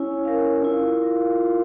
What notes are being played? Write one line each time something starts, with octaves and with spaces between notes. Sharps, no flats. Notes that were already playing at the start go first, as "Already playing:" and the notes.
Already playing: C#4 E4
A#4 F5
E4 F4
A#4